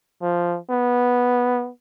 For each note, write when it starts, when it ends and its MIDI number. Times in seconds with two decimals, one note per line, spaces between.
0.22 0.58 53
0.70 1.70 59